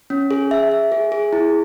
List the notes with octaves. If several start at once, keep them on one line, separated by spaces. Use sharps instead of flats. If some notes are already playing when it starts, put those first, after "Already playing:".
C#4
G#4
E5
E5
G#4
G#4
E4